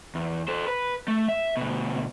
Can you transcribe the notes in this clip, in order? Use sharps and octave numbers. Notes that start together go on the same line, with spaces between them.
E2
A4 C5
B4
A3
E5
D2 B2